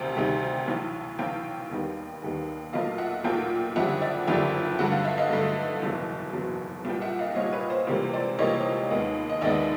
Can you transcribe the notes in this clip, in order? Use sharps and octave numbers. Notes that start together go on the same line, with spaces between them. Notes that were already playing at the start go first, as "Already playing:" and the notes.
Already playing: D2 C3 D#3 G3 G5 A5
D2 C3 D#3 G3
B1 A2 E3
B1 A2 E3 F5 G5
D#2 D#3 G3 B3
D#2 D#3 G3 B3
B1 A#2 F#3 A3 D#5 F5
E5 F#5
B1 A#2 F#3 A3 F5 G5
F#1 F2 D3 G3 E5 F#5
D5 E5
F#1 F2 D3 G3 D5 E5
G2 D3 F#3 A3 F#5
F5
E5
D#5 F5
G2 D3 F#3 A3
F#1 E2 B2 F#3
F#1 E2 B2 F#3
C2 A#2 G3 G5
E5 F#5
D#5 F5
C2 A#2 G3 C#5 D#5
B4 C#5
C5
C#2 C3 E3 G3 A#3 C5
C5 D5
C#2 C3 E3 G3 A#3 C#5 D#5
D#2 D#3 G#3 B3
D#5
D#2 D#3 G#3 B3 D5 E5